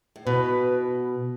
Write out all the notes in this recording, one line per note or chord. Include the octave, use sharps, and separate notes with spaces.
A2
B2 B4